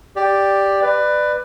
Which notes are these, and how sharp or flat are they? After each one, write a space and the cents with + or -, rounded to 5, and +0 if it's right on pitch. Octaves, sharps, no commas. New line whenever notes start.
G4 +5 D5 +0
B4 +10 D5 +25